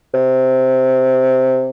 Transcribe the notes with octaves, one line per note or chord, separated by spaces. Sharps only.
C3